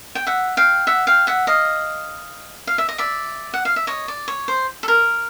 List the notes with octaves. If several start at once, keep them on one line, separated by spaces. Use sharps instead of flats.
G5
E5 F#5
F5 G5
E5 F#5
F5 G5
E5 F#5
D#5 F5
F5
E5
D#5
D5 E5
F#5
F5
E5
C#5 D#5
D5
C#5
C5
A4
A#4